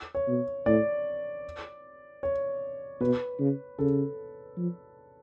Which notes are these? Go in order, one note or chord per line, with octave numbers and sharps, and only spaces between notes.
C#5
B2
A2 D5
C#5
B2 B4
C#3
C#3 A4
F3